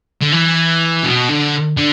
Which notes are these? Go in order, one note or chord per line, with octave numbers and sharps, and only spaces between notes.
D3
E3
B2
D3
D3